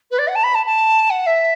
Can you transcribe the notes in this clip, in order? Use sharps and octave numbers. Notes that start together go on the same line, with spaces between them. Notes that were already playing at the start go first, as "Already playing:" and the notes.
B4
D5
F#5
A5
B5
A5
A5
F#5
E5